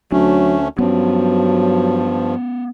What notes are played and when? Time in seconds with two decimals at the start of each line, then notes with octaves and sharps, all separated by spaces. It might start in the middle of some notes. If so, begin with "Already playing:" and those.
0.12 D2 F#3 A3 C#4 D4
0.79 G2 F3 F#3 B3 C#4